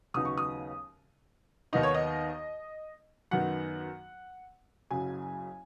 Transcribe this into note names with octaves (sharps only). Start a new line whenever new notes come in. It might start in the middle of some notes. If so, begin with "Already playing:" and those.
D#2 C#3 F#3 B3 D#4 D#6
C#6
D#6
D#2 D#3 B3 D#4 D#5
C#5
D#5
F#2 D#3 B3 D#4 F#5
F#1 F#2 C#3 F#3 G#5